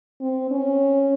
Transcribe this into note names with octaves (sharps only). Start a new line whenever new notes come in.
C4
C#4